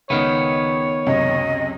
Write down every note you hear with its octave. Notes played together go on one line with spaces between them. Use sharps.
C#2 D#3 B3 C#5
C#2 F#2 C3 D#5